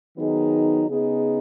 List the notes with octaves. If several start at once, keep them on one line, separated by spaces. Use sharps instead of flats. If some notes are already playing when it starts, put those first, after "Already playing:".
D#3 F#3 B3 D#4 G#4
C#3 B3 D#4 G#4